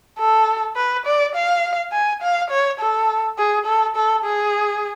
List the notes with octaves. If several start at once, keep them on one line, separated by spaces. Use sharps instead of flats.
A4
B4
D5
F5
G#5
F5
C#5
A4
G#4
A4
A4
G#4